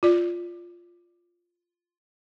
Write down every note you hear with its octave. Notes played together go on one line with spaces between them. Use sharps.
F4 D5